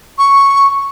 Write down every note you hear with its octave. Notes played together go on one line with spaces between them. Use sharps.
C#6